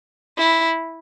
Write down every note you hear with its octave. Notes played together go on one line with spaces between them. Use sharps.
E4